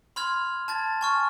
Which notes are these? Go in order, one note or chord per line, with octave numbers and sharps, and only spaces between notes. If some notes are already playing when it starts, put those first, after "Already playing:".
B5 C6 F6 G#6 F7
A5 G#6 A6
G#5 C#6 F6